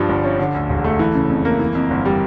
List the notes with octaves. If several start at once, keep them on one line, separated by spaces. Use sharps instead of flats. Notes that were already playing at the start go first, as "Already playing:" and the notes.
Already playing: G2 F3 G3
G1
C#4
D3
D2
E1
A3
E3
C#3
F2
A#3
E3
F2
G1
G3